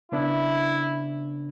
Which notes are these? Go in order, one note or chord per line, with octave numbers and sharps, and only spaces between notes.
C#3 B3 D4 E4